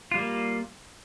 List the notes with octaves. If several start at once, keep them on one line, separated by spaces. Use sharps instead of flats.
G3 A#3 F4